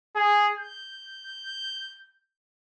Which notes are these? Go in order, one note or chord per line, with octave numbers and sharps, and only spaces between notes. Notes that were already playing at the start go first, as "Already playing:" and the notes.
G#4
G6